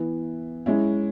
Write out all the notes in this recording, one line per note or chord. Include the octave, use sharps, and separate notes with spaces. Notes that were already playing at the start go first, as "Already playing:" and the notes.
Already playing: E3 B3 E4
G#3 C#4 E4